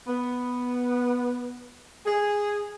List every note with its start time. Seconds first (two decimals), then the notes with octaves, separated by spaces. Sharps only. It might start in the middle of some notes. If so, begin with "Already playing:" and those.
0.08 B3
2.06 G#4